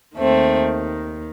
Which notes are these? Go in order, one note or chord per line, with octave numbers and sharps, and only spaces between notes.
D#2 D#3 A3 C4